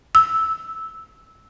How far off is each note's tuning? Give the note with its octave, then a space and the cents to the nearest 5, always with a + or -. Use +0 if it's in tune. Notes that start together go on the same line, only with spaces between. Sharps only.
E6 -10